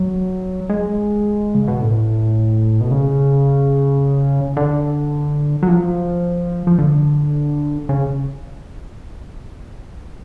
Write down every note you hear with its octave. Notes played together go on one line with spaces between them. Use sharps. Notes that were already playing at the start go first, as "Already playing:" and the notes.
Already playing: F#3
G#3
C#3
B2
A2
B2
C#3
D3
F#3
F3
F3
D3
C#3